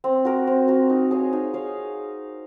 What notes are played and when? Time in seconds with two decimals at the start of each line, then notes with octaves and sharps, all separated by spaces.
0.04 C4
0.25 F#4 A#4
0.47 C4
0.68 F#4 A#4
0.90 D#4
1.11 G#4 C#5 F5
1.33 D#4
1.54 G#4 C#5 F5